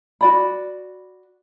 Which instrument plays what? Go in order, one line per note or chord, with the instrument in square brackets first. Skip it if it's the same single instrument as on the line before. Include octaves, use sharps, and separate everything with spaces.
[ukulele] F#4 D5 B5